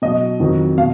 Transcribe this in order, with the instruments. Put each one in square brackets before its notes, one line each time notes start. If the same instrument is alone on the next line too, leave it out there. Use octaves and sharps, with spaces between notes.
[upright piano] B2 F#3 D#5
F2 D#3 F#3
B2 F5